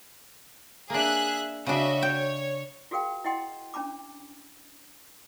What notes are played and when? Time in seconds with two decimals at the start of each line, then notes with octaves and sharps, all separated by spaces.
0.90 A#3 D4 G#4 E5 F#6
1.67 C#3 D4 F#4 D#5 E5
2.03 C#5 G5
2.91 F4 F#4 G#4 A#4 F5 G5
3.25 E4 D#5 F#5 G5 C6
3.74 C#4 D4 A5 B5 D6